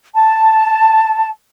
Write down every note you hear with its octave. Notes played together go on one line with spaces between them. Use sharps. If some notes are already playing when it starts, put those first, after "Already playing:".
A5